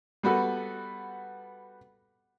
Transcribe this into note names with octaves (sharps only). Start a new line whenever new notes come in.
G3 B3 F#4 A4 B4